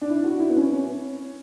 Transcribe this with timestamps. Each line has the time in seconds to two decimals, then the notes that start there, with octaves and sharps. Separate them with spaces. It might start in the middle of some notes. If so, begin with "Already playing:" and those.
0.01 D4
0.10 E4
0.24 F#4
0.40 E4
0.49 B3
0.57 C#4
0.72 C#4